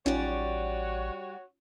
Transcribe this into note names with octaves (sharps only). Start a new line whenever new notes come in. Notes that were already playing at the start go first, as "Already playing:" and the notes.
A1 G3 C#4 D#4 F4 F#4 C#5 D5